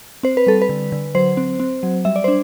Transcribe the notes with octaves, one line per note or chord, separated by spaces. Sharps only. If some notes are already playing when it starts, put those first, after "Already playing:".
C4 C5
B4
G3 A4
B4
D3
D3
F#3 C5
C4
C4
F#3
G3 E5
D5
D4 C5